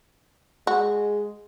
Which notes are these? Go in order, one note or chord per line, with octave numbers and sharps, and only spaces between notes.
G#3 F#4